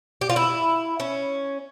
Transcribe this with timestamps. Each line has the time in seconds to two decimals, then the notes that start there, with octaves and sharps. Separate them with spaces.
0.21 G4
0.30 F4
0.36 E4
1.00 C#4